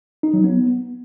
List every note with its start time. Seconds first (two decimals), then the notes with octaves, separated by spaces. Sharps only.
0.23 D#4
0.34 F#3
0.44 B3